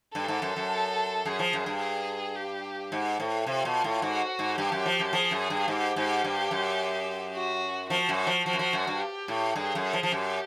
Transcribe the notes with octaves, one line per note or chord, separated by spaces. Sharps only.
G2 A4
G#2
F#2
F#2
F#2 G#4
F3
F#2
G2
G#4
G4
G#2
A2
C3 F4
B2
A2
G#2 F#4
G#2
G2 G4
F#2
F3
F#2
F3 G#4
F#2
G2
G#2 G4
G#2
G2
F#2
F#4
F3 F#4
F#2
F3
F3 F#4
F#2
F3
F#2
G2
G4
A2
G2 G#4
F#2
F3
F3
F#2 G4